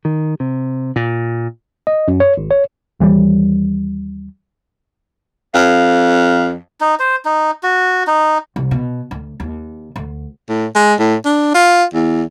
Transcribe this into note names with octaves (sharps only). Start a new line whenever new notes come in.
D#3
C3
A#2
D#5
F#2
C#5
G#1
C#5
D#2 E3 F#3 G3
F2 F5
D#4
C5
D#4
F#4
D#4
C2
B2
D2
D#2
D2
A2
G#3
A2
D4
F4
E2